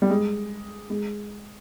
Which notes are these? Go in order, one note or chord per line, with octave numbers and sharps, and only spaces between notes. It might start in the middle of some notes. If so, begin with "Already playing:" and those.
G3
G#3
G#3